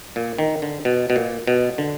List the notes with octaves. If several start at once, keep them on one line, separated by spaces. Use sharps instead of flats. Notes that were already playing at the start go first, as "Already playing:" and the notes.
A#2
D#3
D3
B2
B2
A#2
B2
D3